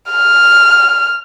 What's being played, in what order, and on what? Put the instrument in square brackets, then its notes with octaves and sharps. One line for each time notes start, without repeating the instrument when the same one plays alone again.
[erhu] F6